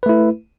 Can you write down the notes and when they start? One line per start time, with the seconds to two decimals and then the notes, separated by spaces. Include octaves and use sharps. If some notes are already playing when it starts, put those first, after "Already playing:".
0.03 B4
0.06 A3
0.09 E4